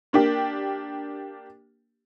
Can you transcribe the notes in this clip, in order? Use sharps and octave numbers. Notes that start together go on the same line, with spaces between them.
A#3 D4 G4